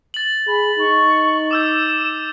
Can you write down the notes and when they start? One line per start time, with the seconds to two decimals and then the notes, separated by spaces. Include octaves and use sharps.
0.14 A6 F#7
0.48 G#4 B5
0.79 D#4 C#6
1.51 D6 E6 G6 E7